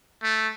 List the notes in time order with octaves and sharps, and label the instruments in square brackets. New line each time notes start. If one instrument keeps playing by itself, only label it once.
[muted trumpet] A3